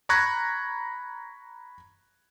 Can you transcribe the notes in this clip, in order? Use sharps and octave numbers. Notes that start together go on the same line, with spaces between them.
A#5 B5 C#6 F#6 G#6 A#6